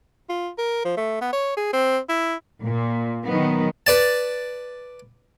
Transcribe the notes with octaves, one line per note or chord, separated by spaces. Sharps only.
F4
A#4
F3
A3
B3
C#5
G#4
C4
E4
A#2
D#3 F#3 B3
B4 D5 A5